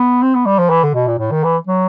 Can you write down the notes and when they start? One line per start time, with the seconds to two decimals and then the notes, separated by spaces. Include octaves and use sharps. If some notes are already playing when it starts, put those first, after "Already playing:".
Already playing: B3
0.23 C4
0.35 B3
0.46 G3
0.59 F3
0.70 E3
0.83 D3
0.94 B2
1.08 A#2
1.19 A2
1.31 D#3
1.44 E3
1.67 F#3